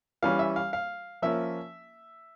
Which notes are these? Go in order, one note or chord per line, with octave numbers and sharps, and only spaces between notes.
E3 G3 C#4 F5
E5
F5
F5
F3 A#3 C#4 E5